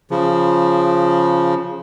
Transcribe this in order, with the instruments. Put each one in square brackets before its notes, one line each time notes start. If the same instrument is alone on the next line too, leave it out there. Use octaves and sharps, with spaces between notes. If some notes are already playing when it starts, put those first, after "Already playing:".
[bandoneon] C#3 F3